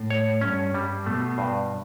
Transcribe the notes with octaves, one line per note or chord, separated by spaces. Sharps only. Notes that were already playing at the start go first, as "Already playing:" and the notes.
Already playing: A2
C#5
G2 C#4
G2 G3
B2 A3
G2